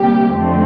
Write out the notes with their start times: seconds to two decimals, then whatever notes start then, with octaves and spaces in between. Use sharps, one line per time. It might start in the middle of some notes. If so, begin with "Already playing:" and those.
Already playing: D2 C3 G3 A#3 G4
0.33 F2 D3 A3 C4